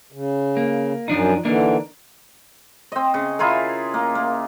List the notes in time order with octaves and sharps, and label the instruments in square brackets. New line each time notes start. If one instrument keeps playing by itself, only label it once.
[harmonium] C#3
[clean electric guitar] A#3
[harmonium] F#2 [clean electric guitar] F3 D4 D#4
[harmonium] D3 E3 [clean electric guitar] A#3 D4 D#4
[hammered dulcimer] C4 D#5
C#3
E4 F4 G#4 A#4
A#3
A#3